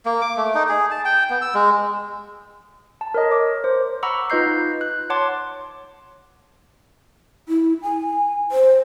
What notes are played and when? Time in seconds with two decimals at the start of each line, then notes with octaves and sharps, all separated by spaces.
0.06 A#3
0.21 D6
0.37 A3
0.55 D#4
0.69 G#4
0.91 A5
1.05 G5
1.30 B3
1.41 E6
1.54 G#3
3.01 A5
3.14 A#4 C#5 D#5
3.32 D6
3.64 C5
4.03 F#5 A#5 B5 C#6 D6 E6
4.30 D#4 F4 B4 D#5 G6 C7
4.81 F#6
5.10 C#5 F#5 A5 C6 D6
7.49 E4
7.83 G#5
8.52 C5